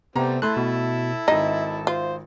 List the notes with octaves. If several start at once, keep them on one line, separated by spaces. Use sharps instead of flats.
C3 G3 A3 B3 C4 A#5
A3 E4 A4 C6 F#6
B2
G#1 D#4 E5 A#6
F4 C5